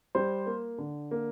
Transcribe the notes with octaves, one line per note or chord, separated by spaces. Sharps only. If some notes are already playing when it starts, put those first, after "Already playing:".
G3 C5
A#3
D3
A#3